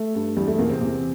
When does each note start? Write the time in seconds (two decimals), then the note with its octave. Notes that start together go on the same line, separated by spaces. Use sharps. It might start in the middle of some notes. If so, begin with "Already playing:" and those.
Already playing: A3
0.15 G2
0.37 E2 G3
0.48 A3
0.58 E2 A#2 A#3
0.69 C3 C4
0.81 E2